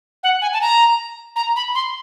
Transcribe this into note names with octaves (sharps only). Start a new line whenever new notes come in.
F#5
G#5
A5
A#5
A#5
B5
C6